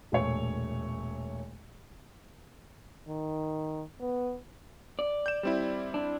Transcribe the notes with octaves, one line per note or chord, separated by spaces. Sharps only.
E1 A#2 A3 C#5 C#7
D#3
B3
D5
G6 E7
G3 C4 E4
D4